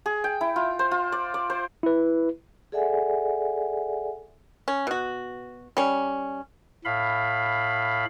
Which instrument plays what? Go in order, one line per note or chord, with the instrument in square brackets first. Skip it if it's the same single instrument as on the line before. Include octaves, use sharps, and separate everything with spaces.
[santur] G#4
G5
E4
F4
C5
F4
D5
D5
C5
[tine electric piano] E4 B4
[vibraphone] G#4 A4 D5 E5 F#5 G#5
[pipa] C#4
B2 F#4
G3 C#4
[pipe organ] A2 F5 B5